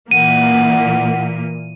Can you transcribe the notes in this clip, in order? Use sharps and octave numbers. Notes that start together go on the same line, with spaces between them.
A#2 E3 A#3 F#5 D#7